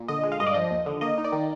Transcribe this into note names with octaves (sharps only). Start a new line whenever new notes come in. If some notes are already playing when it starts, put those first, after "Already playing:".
Already playing: A#2
D3 D#5
G#3
F5
G2 D#5
D5
F3 D#5
D#2
D3
A#3 D#5
D#4
D5
D#3